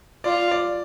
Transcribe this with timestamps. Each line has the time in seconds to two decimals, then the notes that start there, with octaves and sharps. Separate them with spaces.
0.24 F4 D5
0.51 D5